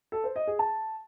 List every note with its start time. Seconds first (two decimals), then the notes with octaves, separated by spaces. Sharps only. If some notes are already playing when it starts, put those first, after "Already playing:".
0.12 A4
0.24 C5
0.36 D#5
0.47 G#4
0.59 A5